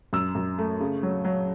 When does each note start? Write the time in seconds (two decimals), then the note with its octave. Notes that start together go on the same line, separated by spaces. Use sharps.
0.13 F#2 E6
0.35 F#2
0.58 A3
0.81 C#3
1.03 F#3
1.25 F#3